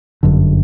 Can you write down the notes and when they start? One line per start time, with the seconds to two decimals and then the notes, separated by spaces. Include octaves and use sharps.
0.23 G1 F#2 D3